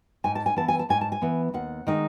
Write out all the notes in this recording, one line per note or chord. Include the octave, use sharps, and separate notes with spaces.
G#2 G#5
A5
G#5
E3 B3 A5
G#5
A5
G#2 G#5
A5
G#5
E3 B3
D#2 F#5
D#3 G#3 D#4